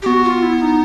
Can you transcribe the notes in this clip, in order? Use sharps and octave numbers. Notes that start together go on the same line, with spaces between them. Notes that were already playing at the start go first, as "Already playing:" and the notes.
G4
B3 F#4
F4
E4
D#4